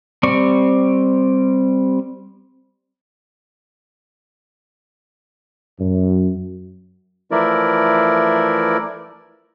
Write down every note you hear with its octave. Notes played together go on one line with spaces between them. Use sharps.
G3 C4 D5 C#6
F#2
E3 F3 A3 E4 A#4 D5